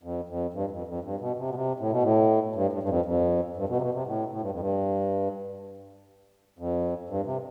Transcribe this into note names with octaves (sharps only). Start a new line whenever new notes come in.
F2
F2
G2
F2
F2
G2
B2
C3
B2
C3
A2
B2
A2
G2
G2
G2
F2
F2
G2
B2
C3
B2
C3
A2
A2
G2
F2
G2
F2
G2
C3